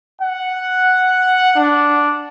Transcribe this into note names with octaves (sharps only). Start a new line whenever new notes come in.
F#5
D4